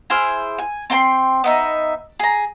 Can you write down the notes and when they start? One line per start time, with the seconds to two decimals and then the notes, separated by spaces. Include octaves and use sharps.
0.10 E4 G#4 C5 F6
0.58 G#5
0.90 C4 G5 A5 C6
1.44 B3 D#4 E5
2.19 G#4 A#5